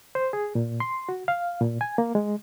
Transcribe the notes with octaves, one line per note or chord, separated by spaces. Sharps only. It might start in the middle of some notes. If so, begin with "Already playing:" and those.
C5
G#4
A#2
C6
F#4
F5
A#2
G#5
A#3
G#3